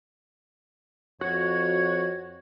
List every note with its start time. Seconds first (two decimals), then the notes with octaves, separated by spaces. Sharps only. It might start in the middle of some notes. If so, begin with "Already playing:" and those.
1.21 F2 F#4 C#5 G#6